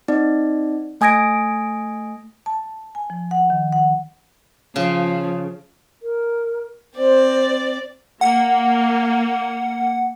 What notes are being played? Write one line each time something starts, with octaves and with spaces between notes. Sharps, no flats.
C4 D#4 D5
A3 G#5 D#6 G#6 A#6 D7
A5
G#5
F3
F#5
D#3
F#5
C#3 F3
A#4
C4 C5 D5
A#3 F#5